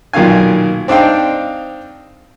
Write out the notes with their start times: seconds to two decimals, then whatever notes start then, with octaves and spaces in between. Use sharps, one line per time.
0.13 B1 A#2 D#3 F5 G#5
0.88 C4 D4 D#4 F5 G5